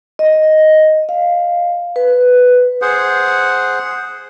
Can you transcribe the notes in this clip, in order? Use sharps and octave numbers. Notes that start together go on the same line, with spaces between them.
D#5
F5
B4
G#4 C5 F#5